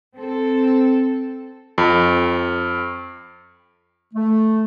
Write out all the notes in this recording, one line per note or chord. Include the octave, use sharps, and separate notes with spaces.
C4 A4
F2
A3